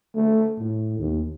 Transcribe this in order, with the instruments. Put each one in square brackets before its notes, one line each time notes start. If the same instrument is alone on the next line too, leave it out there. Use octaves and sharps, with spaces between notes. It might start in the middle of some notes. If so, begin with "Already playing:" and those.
[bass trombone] A3
A2
D#2